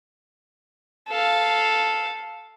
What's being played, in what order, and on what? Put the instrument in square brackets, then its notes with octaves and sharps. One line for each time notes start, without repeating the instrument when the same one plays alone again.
[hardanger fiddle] A4 F5